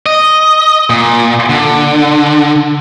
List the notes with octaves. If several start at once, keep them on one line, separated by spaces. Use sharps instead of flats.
D#5
A#2
D3